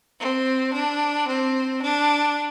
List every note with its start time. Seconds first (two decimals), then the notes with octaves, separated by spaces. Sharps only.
0.17 C4
0.71 D4
1.25 C4
1.81 D4